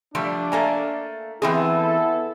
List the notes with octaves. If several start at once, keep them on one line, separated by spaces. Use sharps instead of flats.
F3 G3 A3 D4
A3 A#3 G#5
E3 B3 C4 E4 G#4 A4